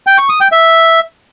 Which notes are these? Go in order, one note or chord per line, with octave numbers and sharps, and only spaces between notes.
G5
C#6
D#6
G5
E5